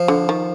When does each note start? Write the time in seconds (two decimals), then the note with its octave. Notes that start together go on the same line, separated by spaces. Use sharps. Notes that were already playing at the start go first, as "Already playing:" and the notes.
Already playing: F3
0.08 D3
0.29 D#3